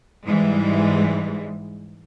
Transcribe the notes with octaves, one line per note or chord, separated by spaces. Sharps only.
G#2 E3 G3 G#3